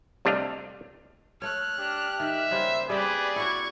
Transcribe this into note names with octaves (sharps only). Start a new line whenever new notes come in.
C3 G3 A3 D4 D#5 F5
A3 C#5 F6 F#6
D4 G4
D#3 E5
C#3 G3 A#3 C5
G3 C4 G4 G#4 B4 D5
E4 F#4 E5 C#6 G#6